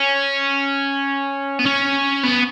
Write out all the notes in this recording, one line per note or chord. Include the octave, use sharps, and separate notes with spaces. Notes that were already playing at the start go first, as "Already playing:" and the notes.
Already playing: C#4
B3
C#4
B3